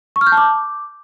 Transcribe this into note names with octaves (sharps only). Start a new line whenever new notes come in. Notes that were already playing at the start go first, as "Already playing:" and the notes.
C#6
F6
G6
A5
D6